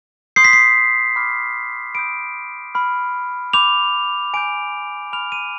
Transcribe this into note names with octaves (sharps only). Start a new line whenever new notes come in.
C6 D#6 G6 C7
B6
C7
B5 D6 F6
B5 D#6 G6 D7
B5 F6
B5 D6 G6 F7
G#5 D6 G6 D7
B5 F6 F7
D#7